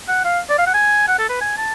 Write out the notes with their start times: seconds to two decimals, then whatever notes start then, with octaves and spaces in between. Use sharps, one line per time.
0.08 F#5
0.25 F5
0.50 D5
0.58 F5
0.67 F#5
0.74 G#5
1.08 F#5
1.19 A4
1.29 B4
1.41 G#5
1.58 A5